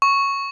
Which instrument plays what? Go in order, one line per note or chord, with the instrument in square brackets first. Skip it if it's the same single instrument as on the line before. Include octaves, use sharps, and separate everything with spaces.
[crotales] C#6